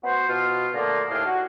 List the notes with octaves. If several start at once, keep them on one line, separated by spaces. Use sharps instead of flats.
B3 F#4 C5
B2 F4
A#2 D3 F3 A3 A#3
D#2 A2 D4 G4 G#4 F5
F#4